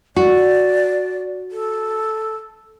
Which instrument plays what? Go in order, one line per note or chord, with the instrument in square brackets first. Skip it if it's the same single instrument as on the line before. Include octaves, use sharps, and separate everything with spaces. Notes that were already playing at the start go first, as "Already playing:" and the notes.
[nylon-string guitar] F#4 [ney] D5
[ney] A4